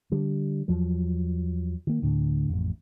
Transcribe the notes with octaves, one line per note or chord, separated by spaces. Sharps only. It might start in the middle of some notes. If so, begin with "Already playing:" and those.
D3 G3
E2 F3 F#3
D#3 A#3
D2 A2 D3
A1 F2